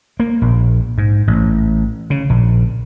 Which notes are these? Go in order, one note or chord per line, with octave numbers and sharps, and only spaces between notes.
A#3
A#1
G#2
A1
C#3
A#1